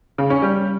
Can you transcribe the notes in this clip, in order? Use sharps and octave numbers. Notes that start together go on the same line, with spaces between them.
C#3
C#4
G3